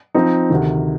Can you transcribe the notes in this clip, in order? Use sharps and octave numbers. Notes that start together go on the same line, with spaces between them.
F3 C4 D#4
D2 C3 D#3